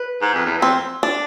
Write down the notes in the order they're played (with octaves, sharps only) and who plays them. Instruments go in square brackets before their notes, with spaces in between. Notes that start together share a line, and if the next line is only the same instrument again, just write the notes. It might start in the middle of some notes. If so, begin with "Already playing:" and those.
Already playing: [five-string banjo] B4
[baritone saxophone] G#2
F2
E2
[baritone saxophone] F2 [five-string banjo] C4
[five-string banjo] D4